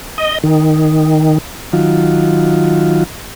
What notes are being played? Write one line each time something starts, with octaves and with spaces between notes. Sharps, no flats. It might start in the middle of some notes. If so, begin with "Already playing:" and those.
D#5
D#3
D#3 F#3 F4